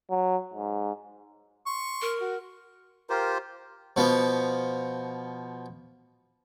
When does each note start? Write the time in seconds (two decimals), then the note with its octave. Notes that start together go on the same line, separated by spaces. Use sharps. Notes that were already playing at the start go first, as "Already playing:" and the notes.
0.10 F#3
0.54 G#2
1.67 C6 C#6
2.02 A#4
2.20 F#4
3.10 F4 G4 A#4 C5
3.96 B2 F3 B3